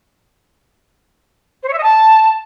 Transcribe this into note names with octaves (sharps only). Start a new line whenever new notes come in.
C5
C#5
E5
D#5
A5